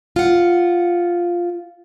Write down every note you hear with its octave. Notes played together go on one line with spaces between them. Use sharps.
F4 F#5